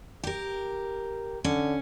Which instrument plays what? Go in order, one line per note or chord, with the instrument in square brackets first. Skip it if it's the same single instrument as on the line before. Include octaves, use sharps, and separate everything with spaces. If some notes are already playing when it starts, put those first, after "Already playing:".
[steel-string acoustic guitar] G4 A#4
[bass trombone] D3 [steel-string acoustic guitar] C#4